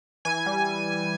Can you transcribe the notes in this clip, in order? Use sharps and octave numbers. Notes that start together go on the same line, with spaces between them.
E3 G#5
G3